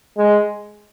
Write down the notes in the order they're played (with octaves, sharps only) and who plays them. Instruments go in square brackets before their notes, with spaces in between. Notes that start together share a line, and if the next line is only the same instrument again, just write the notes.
[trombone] G#3